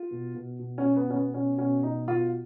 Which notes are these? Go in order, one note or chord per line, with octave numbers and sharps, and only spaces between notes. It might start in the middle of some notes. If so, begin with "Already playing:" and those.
Already playing: F4
B2
B2
B2
C#4
B2
B3
B2 C#4
B3
B2 C#4
B2 C#4
B2 D#4
B2 F4